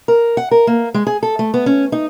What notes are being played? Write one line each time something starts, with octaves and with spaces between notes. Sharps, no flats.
A#4
F#5
A#4
A#3
G#3
G#4
A4
A3
B3
C#4
D#4